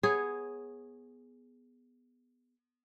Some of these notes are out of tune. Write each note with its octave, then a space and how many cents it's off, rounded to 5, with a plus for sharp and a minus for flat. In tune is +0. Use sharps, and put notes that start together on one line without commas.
B3 +0 G#4 +0 C#5 -15